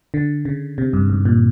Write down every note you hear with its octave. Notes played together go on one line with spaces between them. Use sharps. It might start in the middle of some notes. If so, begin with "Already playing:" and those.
D3
C#3
C3
G2
G#2
A#2